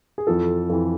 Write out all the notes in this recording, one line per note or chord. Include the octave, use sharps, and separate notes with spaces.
G#4
F2 E3 F4 A4
F2 E3